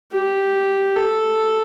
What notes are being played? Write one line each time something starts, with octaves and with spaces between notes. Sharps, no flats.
G4
A4